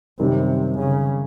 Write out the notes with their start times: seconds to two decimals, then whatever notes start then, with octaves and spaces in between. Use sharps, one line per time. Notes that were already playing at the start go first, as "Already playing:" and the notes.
0.19 F#2 C3 D#3 G3 C4 E4
0.79 C#3